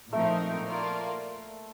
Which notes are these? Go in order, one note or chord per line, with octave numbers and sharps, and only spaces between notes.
A#2 F3 A3 C4 D#4 A#4
A#3 F4 A#4 D5